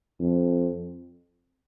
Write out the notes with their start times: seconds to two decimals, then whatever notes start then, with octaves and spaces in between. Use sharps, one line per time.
0.20 F2